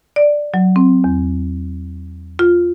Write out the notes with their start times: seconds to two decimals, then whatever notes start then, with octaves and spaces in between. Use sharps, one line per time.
0.16 D5
0.54 F#3
0.76 C4
1.04 E2
2.39 F4